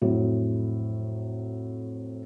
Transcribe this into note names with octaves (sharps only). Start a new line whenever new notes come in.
F2 A2 F#3